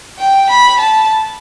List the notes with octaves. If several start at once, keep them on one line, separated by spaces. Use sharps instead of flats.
G5
B5
A5